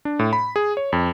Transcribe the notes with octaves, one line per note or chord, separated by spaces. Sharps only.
D4
A2
B5
G#4
C#5
F2